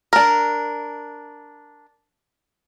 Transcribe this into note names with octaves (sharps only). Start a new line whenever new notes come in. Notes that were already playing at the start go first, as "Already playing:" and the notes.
D4 A#4